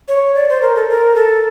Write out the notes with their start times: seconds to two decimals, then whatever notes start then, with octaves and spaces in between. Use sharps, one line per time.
0.08 C#5
0.35 D5
0.49 C5
0.62 A#4
0.75 A4
0.89 A#4
1.15 A4